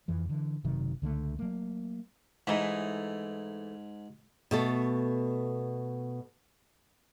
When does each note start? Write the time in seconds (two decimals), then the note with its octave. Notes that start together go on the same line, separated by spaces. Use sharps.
0.08 F2 E3 F3
0.29 D3 E3
0.64 F#1 C3 D#3 F#3
1.02 C#2 D3 F3 A3
1.39 F#3 A3 A#3
2.47 G#2 E3 A3 D#4
4.51 B2 A3 A4